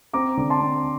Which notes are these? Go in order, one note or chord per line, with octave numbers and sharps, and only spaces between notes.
C4 A#5 D6
D3
A5 C6
C4